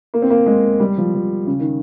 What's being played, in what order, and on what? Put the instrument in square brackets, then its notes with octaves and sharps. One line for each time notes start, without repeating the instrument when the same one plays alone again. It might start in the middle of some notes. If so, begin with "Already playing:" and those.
[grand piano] A#3
C4
A#3
G#3
G3
F3
F3
C#3
D#3